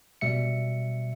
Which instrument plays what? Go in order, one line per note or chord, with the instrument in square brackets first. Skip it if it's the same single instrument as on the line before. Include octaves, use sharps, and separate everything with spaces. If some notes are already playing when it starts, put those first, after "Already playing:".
[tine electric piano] B2 G3 E5 C#7